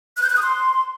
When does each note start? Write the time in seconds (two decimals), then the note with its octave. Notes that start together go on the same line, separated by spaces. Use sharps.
0.17 F#6
0.23 G6
0.29 F#6
0.36 D#6
0.42 C6